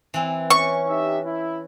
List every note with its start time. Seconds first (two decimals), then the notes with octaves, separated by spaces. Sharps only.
0.14 E3 C4
0.50 C#4 C#6
0.88 D#4 G4 E5
1.26 E4